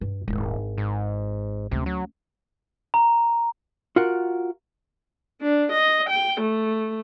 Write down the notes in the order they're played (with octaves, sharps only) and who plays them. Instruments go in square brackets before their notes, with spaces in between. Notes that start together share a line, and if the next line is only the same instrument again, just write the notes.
[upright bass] G2
[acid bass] D#1 [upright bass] G#1 E4
[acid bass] G#2
[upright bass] D2 C#4 [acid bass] C3
[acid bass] F#3
[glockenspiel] A#5
[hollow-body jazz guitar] F4 F#4 A#4 F#5
[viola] D4
D#5
G5
A3